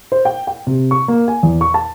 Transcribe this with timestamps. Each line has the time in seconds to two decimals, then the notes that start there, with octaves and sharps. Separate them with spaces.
0.12 C5
0.25 G5
0.47 G5
0.67 C3
0.91 C#6
1.08 A#3
1.28 G#5
1.43 E2
1.61 C#6
1.74 A5